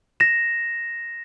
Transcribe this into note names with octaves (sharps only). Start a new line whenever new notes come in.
A#6 E7